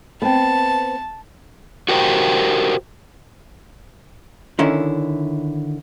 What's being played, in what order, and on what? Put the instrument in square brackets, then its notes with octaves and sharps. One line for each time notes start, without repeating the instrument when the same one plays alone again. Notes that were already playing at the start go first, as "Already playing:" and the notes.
[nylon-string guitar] B3 C4 [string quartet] A5
[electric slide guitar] F#4 G4 A#4 C5 G5
[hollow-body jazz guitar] D3 D#3 C#4 E4